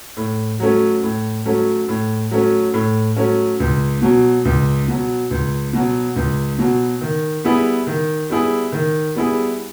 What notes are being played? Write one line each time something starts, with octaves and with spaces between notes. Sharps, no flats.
A2
F#3 A3 C#4
A2
F#3 A3 C#4
A2
F#3 A3 C#4
A2
F#3 A3 C#4
C#2
B2 F#3
C#2
B2 F#3
C#2
B2 F#3
C#2
B2 F#3
D#3
G3 B3 E4 G#4
D#3
G3 B3 E4 G#4
D#3
G3 B3 E4 G#4